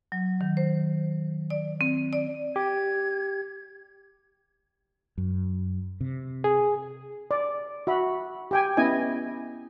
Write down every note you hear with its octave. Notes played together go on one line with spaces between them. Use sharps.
F#3
D#3
C5
D5
C4
D5
G4 G#6
F#2
C3
G#4
D5
F#4 E5 B5
G4 G5 G#5
B3 C#4 E4 D#5 G#5